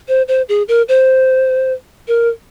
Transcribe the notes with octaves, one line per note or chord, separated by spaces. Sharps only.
C5
C5
G#4
A#4
C5
A#4